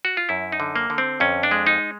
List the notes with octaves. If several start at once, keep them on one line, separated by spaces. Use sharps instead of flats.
F#4
F4
F#2 E4
D#4
D3
A#3
D3
C4
F2 C#4
D4
G#3
D#4